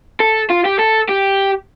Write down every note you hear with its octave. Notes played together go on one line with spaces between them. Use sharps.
A4
F4
G4
A4
G4